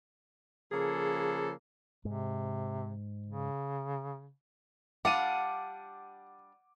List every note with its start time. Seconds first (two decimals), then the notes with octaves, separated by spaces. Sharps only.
0.72 C#3 F3 A#3 G#4 A4
2.05 G#2 C3
3.26 C#3
5.05 G3 D4 F4 F#5 D6 D#7